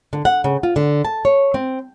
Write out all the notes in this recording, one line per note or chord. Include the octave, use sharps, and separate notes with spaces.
D3
F#5
C#3
F4
D3
A5
C#5
C4